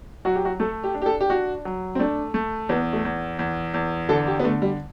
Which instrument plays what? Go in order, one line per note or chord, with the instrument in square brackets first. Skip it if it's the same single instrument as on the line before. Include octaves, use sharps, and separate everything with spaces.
[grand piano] F#3 [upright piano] F#4
[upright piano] G4
F#4
[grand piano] A3 [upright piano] A4
[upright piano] G4
[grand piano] D4
[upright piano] G4
A4
G4
[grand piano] D4 [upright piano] F#4
[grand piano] F#3
[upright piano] C4
[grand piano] A3 [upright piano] D4
[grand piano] A3
[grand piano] E2 [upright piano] B3
[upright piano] A3
[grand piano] E2
E2
E2
[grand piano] D3 [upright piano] A4
[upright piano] G4
B3
[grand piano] D3 [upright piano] A3
[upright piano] G3